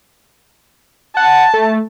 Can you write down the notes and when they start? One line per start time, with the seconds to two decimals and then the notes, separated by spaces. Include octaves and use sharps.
1.17 F#5 A5
1.54 A3